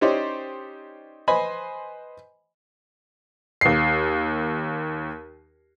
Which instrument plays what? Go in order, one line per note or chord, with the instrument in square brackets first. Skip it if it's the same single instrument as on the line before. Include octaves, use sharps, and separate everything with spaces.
[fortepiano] C#4 D#4 G4 C5 D5 D#5
B4 C5 D#5 G#5 B5
[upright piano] D#2 C7